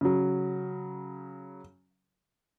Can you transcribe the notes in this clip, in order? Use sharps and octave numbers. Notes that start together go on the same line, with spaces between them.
C#3 F#3